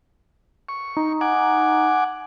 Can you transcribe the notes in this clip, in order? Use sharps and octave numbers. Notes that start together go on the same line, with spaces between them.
C#6
D#4
F#5 G#5 D6